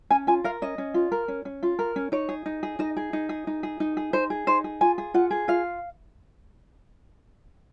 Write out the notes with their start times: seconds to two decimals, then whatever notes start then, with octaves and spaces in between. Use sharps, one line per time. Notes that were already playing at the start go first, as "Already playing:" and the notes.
0.10 C#4 G#5
0.27 F4 G#5
0.44 A#4 F5
0.62 C#4 D#5
0.78 C#4
0.94 F4
1.12 A#4
1.28 C#4
1.45 C#4
1.63 F4
1.79 A#4
1.96 C#4
2.12 D#4 C#5
2.29 G#4
2.46 D#4
2.63 G#4
2.79 D#4 D#5
2.97 G#4
3.13 D#4
3.29 G#4
3.47 D#4
3.63 G#4
3.80 D#4
3.97 G#4
4.13 D#4 C5
4.30 G#4
4.47 D#4 C5
4.64 G#4
4.81 F4 G#5
4.98 G#4
5.14 F4 F#5
5.31 G#4
5.48 F4 F5